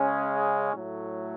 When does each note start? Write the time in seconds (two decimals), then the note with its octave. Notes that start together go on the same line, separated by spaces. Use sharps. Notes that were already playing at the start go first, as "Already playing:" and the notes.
Already playing: C#3 G#3 C#4 G#4
0.73 A2 F#3 A3